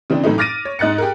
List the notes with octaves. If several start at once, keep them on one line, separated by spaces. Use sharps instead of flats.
C#3 E3 C4 D4
F#2 A2 E3 A3 D#4
D6 F6 A6 A#6 D7 D#7
C#5
G#2 D#5 F#6 A6 C#7
G4 G#4 A#4